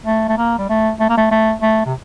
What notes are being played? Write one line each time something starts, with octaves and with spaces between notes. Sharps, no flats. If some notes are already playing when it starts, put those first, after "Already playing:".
A3
A3
A#3
G3
A3
A3
A#3
A3
A3
A3
C3